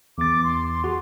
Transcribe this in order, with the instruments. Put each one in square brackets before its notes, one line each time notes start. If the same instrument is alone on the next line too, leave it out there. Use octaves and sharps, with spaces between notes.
[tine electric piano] E2 A6 [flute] D6
[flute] C6
[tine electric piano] F#4 G#4